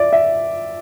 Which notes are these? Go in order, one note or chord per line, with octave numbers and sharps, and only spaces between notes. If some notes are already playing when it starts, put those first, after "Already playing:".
Already playing: D5 E5
E5